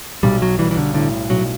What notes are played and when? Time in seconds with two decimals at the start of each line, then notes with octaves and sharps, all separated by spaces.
0.23 B1 G3
0.42 F#3
0.59 E3 G3
0.71 E3
0.77 D3
0.94 A2 D3
1.30 B1 F#3